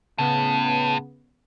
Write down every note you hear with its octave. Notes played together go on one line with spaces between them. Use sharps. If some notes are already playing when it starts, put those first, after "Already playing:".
A2 C#3 B3